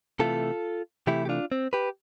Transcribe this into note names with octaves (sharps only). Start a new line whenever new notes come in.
C3 E3 A3 F4 A4
C3 E3 A3 E4 G4
G4
D4 F4
C4
G4 B4